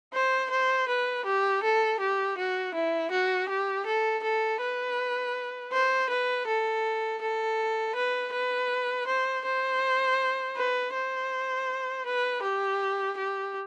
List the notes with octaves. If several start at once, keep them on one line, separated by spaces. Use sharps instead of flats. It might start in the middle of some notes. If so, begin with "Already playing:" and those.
C5
C5
B4
G4
A4
G4
F#4
E4
F#4
G4
A4
A4
B4
C5
B4
A4
A4
B4
B4
C5
C5
B4
C5
B4
G4
G4